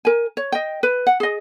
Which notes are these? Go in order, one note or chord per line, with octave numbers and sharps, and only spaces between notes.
A#4 G#5
C#5
D#5 G5
B4
F#5
G#4 D#5